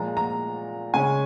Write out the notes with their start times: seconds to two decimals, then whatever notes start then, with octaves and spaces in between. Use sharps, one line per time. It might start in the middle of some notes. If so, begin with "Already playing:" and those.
Already playing: A#2 F3 G#3 A#5
0.17 A#5
0.94 C#3 G#3 C#4 G#5